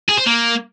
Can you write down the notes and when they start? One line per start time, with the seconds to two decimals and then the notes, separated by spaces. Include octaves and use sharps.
0.09 G#4
0.18 C5
0.27 A#3